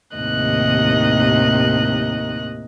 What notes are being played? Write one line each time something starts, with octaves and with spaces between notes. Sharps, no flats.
D#2 A2 C3 D#3 D#5 F#6